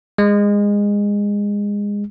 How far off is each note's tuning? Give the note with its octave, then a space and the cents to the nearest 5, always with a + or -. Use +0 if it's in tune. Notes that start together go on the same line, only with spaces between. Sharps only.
G#3 -20